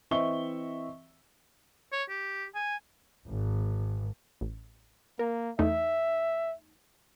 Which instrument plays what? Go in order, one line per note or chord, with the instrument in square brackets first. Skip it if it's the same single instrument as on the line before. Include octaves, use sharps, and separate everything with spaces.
[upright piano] E3 C4 D#5 E5 C#6 G7
[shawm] C#5
G4
G#5
[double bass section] G#1
[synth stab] A1
[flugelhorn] A#3 [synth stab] A#4
[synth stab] E2 A3 D#4 [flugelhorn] E5